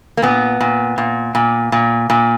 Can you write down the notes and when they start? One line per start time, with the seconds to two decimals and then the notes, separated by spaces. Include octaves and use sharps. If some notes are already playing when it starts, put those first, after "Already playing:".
0.17 A#3
0.22 A#2 B3
0.61 A#2
0.98 A#2
1.35 A#2
1.72 A#2
2.10 A#2